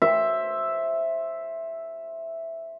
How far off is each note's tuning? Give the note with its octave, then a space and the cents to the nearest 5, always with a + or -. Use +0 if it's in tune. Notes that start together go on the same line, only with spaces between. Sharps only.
C5 +15 E5 +0